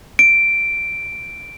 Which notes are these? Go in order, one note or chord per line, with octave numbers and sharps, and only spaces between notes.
D7